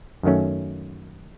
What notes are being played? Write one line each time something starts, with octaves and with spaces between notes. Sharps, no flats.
F#2 D#3 F#3 A3 C#4